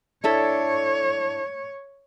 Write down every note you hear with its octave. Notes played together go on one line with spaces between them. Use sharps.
D4 E4 A4 C#5